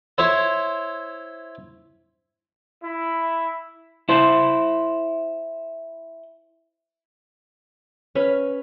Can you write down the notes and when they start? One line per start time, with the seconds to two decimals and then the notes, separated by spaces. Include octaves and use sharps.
0.18 E4 C5 C#5 E5
2.83 E4
4.09 E4 C5
8.15 C#4 B4 B5 F6